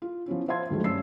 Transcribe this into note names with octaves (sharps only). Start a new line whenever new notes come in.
F4
F3 B3 C#4 E4
C5 E5 F5 A5 C6 G#6
D2 D#3 F#3 G#3 A3
G2 C#4 A5 E6 C7